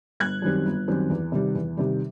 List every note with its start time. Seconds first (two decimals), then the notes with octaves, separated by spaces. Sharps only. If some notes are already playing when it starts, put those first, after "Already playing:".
0.20 G1 F#6 G#6
0.42 F#2 D#3 G3 C4
0.65 G1
0.88 F#2 D#3 G3 C4
1.10 E2
1.32 C3 D#3 G3
1.55 E2
1.77 C3 D#3 G3